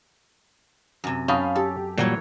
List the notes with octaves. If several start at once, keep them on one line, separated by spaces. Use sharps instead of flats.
F#2 C3
F#2 C#4 F5 G5 A5 B5 D#6
G4 A4
A#2 E3 F#3 G3 A#3 C#5